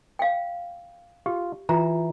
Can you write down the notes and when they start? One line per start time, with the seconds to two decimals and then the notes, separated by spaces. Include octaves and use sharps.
0.19 F5 G5
1.26 F4 G4
1.69 E3 F4 A#5